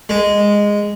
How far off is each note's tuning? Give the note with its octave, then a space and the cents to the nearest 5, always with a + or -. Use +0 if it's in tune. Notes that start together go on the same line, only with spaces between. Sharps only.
G#3 -10